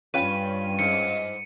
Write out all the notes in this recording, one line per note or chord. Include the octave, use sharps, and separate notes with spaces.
G2 C#4 F4 B4 G5 D#7
G#2 C#7